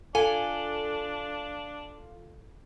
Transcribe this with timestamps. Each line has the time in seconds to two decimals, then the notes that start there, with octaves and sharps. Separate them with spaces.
0.15 D4 F4 A4 G#5